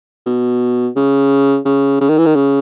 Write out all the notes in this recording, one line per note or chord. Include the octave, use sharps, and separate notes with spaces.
B2
C#3
C#3
C#3
D#3
E3
D#3
C#3